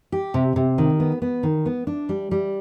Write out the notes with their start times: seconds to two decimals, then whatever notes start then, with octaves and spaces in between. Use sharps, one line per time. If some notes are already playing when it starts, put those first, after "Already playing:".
0.12 G4
0.34 C3
0.56 C3
0.78 D#3
1.00 B3
1.22 B3
1.43 D#3
1.66 B3
1.87 D4
2.09 G3
2.31 G3